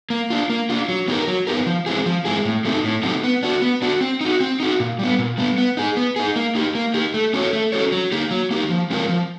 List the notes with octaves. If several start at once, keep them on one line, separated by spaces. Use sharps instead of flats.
A#3
D4 F4
A#3
D4 F4
F#3
B3 D#4 G4 A#4
F#3
B3 D#4 G4 A#4
F3
G#3 C4 E4 G#4
F3
G#3 C4 E4 G#4
A2
F#3 A3 C4 D#4
A2
F#3 A3 C4 D#4
B3
D4 F#4
B3
D4 F#4
C4
D#4 F#4
C4
D#4 F#4
A#2
G3 B3
A#2
G3 B3
B3
D#4 G#4
B3
D#4 G#4
A#3
D#4 G4
A#3
D#4 G4
A3
C#4 F#4 A4 C#5
A3
C#4 F#4 A4 C#5
F#3
A#3 D#4 G4
F#3
A#3 D#4 G4
F3
G#3 C4 F4 A#4
F3